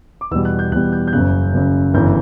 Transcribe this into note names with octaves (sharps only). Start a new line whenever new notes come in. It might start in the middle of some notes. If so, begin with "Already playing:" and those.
D6
E2 B2 G3 E6
F#6
G6
E2 B2 G3 F#6
G6
G6
F#1 F#2 C#3 F#6
F#1 F#2 C#3
G1 F#2 C#3 E3 G6